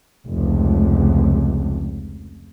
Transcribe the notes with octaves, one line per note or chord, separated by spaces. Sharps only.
F1 C#2